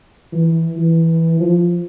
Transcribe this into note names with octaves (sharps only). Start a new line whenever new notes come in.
E3
E3
F3